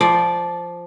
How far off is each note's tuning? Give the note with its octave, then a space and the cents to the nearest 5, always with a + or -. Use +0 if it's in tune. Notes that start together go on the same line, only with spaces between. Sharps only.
F3 -5 D5 +0